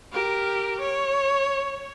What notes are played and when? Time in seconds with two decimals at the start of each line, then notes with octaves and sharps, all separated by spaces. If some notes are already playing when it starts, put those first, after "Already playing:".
0.12 G4 A#4
0.81 C#5